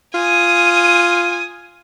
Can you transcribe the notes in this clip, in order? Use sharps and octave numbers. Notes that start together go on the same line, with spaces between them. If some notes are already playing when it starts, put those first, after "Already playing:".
F4 G#5 D#6